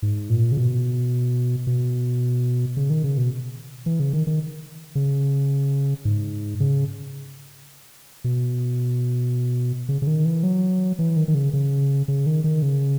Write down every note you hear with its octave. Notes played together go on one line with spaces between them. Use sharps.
G#2
A#2
C#3
B2
B2
C#3
D#3
C#3
B2
E3
C#3
D#3
D#3
C#3
G#2
C#3
B2
C#3
C#3
D#3
E3
F#3
E3
D#3
D#3
C#3
C#3
C#3
D#3
D#3
C#3